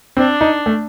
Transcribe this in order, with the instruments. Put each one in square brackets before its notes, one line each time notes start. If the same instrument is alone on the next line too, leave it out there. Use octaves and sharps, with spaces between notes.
[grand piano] C4 [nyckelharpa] D4
[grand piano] D#4
A3